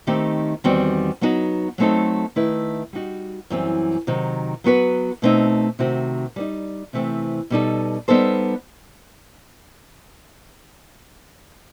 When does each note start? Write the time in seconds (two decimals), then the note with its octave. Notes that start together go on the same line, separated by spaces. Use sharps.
0.07 D#3 A3 C4 D#4 G4
0.64 E2 D#3 G3 C4 F#4
1.21 F#3 B3 D#4 F#4
1.78 F#3 A3 C4 D#4 A4
2.36 D#3 A3 E4 B4
2.93 G3 D#4 F#4
3.50 F#2 E3 G3 C4
4.07 C3 D#3 F#3
4.64 F#3 B3 F#4 B4
5.22 B2 A3 C4 D#4
5.79 C3 D#3 A3 C4 F#4
6.36 G3 B3 D#4
6.93 C3 E3 A3 C4
7.50 B2 G3 D#4 A4
8.08 G3 B3 D#4 A4 C5